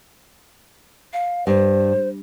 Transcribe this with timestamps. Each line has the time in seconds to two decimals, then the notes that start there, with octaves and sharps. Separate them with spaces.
1.13 F5
1.47 G2 C5